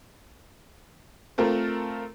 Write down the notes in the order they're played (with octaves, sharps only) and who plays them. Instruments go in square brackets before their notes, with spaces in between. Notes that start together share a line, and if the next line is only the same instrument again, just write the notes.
[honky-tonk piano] A3 C4 F4 A4 A#4